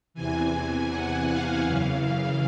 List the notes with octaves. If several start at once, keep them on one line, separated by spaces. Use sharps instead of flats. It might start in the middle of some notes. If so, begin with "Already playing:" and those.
E2 C3 E3 G#5
F#5
F5
F#2 C#3 E3